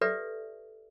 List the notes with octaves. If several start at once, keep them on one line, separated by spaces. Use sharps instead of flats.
G4 A4 B4 D5 E5